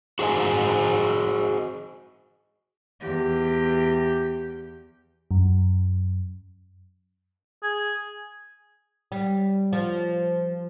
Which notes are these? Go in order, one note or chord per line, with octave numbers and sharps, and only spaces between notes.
F#4 G#4 C5 D#5 G#5
E2 G4
F#2
G#4
G3
F3